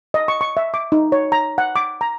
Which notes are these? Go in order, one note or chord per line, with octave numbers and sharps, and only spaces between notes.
D#5
C#6
C#6
E5
D6
D#4
C#5
A#5
F#5
D6
A#5